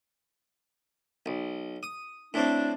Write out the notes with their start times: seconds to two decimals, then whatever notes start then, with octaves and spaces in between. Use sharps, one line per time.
1.26 B1
1.83 D#6
2.34 A2 C4 D4